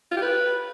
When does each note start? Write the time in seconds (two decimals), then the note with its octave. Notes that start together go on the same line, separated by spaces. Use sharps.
0.11 F4
0.17 G4
0.22 B4